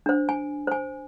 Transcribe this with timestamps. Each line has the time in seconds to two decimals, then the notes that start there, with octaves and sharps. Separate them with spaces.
0.06 D4 C5
0.29 G#5
0.67 C5 G#5